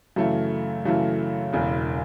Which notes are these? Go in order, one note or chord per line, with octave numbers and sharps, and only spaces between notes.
F#2 C#3 E3 A3
F#2 C#3 E3 A3
E1 E2 C#3